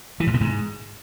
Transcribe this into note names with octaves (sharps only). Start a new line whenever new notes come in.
E3
G#2
B2
G#2